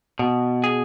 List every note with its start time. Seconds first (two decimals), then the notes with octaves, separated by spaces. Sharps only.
0.19 B2
0.64 G#4